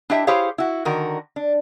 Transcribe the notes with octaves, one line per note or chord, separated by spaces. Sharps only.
D4 E4 G4 D#5 E5 G5
E4 G4 G#4 C5 C#5 F5
E4 F#4
D3 D#3 F#4 A#4
D4